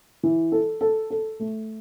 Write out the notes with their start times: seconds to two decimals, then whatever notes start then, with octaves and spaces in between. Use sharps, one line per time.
0.23 E3
0.52 A4
0.81 A4
1.10 A4
1.40 A3